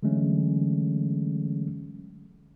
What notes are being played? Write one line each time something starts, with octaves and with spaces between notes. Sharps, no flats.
D3 E3 F#3 G#3 A3 C#4